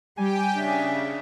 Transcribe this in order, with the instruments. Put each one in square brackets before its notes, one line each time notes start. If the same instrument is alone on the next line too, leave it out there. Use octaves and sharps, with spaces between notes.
[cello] G3 [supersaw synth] G4 G5 [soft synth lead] G#5
[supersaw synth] C#3 [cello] D4 E5